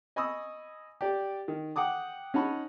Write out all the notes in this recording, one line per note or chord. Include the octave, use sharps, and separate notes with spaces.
D#5 G#5 B5 C#6 D#6 E6
G4 D5
D#3
F#5 G5 D6 D#6
C#4 D#4 F#5 A5 B5 C#6